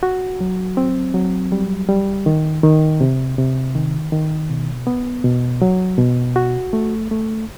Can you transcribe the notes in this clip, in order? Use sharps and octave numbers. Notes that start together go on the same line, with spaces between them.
F#4
F#3
C4
F#3
G3
G3
D#3
D#3
C3
C3
D#3
D#3
B2
B3
B2
F#3
B2
F#4
A3
A3